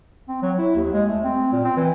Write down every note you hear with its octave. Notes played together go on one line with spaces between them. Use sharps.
C4
F#3
E4
D#2
G#3
A3
C4
A#2
C4
E3